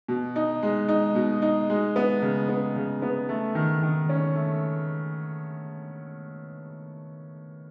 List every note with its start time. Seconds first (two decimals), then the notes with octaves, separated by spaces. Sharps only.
0.08 B2
0.36 D#4
0.63 G#3
0.88 D#4
1.15 B2
1.42 D#4
1.70 G#3
1.96 B3
2.22 C#3
2.49 B3
2.76 C#3
3.02 B3
3.29 A3
3.55 D#3
3.83 D#3
4.09 C#4
4.35 A3